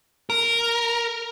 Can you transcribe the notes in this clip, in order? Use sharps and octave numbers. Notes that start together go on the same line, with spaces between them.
A#4